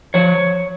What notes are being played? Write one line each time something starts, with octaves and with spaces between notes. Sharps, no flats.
F3 C#5